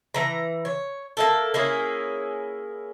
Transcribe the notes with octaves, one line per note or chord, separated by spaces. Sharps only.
E3 A#5
C#5
A#3 E4 A4
A#3 C#4 E4 G#4